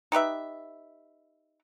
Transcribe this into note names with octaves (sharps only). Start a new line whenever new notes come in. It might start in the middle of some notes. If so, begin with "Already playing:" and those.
D#4 G4 B4 E5